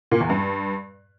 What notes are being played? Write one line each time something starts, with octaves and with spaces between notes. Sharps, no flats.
A#2
E2
G2